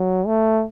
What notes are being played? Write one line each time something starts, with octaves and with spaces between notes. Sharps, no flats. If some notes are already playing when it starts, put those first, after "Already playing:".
Already playing: F#3
A3